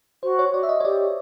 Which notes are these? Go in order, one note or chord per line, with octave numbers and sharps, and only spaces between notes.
F#4 C5
C#5
F#4 D5
E5
D#5
C#5
G4 D5